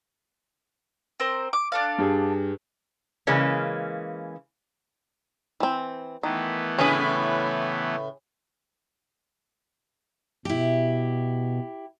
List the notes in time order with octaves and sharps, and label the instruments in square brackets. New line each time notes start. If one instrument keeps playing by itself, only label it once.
[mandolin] C4 A#4 C5
D6
D4 A4 F5
[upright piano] G2 G4 G#4
[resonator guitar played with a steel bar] C#3 E3 G#3 A#3 C#4
[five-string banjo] E3 C4
[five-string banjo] D#3 [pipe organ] E3 A3 B3
[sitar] A2 C#3 B4 [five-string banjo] C#4 G#4
[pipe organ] B2 [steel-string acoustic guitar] E4 G4